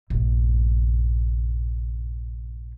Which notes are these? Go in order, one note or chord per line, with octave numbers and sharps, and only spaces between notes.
A#1 G2